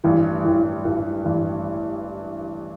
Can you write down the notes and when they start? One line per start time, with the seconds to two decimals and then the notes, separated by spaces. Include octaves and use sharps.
0.04 A1 G2 E3
0.44 A1 G2 E3
0.84 A1 G2 E3
1.24 A1 G2 E3